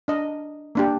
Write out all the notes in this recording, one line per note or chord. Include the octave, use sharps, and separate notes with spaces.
D4 D#5
A#3 D4 G4